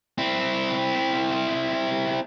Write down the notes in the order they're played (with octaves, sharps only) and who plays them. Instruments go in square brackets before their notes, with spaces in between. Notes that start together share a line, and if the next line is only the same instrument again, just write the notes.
[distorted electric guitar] C4 E4